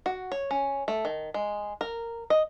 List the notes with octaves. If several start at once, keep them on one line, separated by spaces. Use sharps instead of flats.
F#4
C#5
C#4
A3
D#3
G#3
A#4
D#5